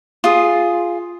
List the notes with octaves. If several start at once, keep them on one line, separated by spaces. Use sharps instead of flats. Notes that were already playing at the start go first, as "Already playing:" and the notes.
F4 G#4